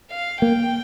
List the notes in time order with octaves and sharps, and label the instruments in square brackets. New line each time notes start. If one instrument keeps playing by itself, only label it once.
[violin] F5
[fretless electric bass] A#3 [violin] G5